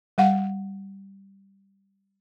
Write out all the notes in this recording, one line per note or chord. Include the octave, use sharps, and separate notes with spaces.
G3 F5 F#5